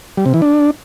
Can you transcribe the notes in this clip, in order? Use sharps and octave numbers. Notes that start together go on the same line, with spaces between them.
G3
C3
E3
D4